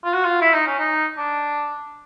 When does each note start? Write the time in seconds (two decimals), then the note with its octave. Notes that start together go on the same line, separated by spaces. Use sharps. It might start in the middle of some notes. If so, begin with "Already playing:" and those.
0.04 F4
0.14 F#4
0.24 F4
0.41 E4
0.54 D#4
0.67 C#4
0.79 D#4
1.17 D4